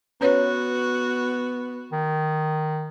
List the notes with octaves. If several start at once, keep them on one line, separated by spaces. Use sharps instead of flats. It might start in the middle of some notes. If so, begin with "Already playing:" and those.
B3 C#4 F#4 B4 C#5
D#3